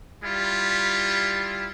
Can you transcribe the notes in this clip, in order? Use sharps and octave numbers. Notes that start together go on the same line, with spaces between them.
G3 E4 F4